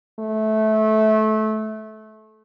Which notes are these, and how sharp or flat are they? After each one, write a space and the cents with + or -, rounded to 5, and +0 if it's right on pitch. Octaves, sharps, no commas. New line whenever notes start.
A3 -20